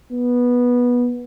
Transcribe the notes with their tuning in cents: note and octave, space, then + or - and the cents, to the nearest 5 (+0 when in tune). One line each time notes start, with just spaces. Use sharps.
B3 -15